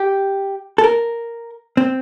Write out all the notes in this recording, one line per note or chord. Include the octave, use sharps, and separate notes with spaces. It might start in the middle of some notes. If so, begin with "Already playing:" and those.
Already playing: G4
A4
A#4
C4